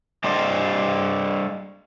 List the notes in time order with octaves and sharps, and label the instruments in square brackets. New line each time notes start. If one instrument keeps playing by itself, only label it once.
[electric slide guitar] G3 D4 G4 C5 D5 D#5